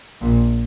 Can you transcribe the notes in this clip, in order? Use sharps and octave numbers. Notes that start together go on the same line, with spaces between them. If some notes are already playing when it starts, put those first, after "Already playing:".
A#1 A#2